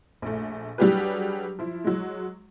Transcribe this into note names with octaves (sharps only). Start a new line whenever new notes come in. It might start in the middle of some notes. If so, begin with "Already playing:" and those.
A#1 A3
F#3 G3 D4 G4 G#4 B4
F3 E4
F#3 G#3